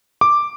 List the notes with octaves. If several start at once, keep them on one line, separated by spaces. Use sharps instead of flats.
D6